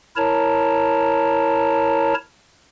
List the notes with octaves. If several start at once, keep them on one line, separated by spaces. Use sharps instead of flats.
E4 A#4 C#5 A5 A#5